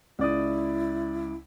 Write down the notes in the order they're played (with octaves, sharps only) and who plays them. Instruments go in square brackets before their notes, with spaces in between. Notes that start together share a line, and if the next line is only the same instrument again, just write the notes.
[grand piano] C#2 D5 D#6 [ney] E4